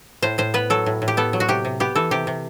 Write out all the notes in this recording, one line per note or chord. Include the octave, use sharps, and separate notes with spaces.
A2 C5
A2 C5
B3 B4
F#3 A4
A2
A2
G4
B3 A4
F#3
F#4
C3 G4
C3
B3 G4
E3 A4
C3 G4
C3